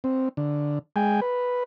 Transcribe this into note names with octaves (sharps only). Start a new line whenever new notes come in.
C4
D3
G#3 G5 G#5
B4